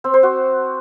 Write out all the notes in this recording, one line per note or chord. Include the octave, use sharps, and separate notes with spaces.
C4
C5
F#4